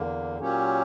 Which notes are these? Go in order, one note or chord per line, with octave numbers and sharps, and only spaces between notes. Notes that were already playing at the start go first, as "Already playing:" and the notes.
Already playing: E2 D3 A#3
A#2 F#3 A#3 C#4 G4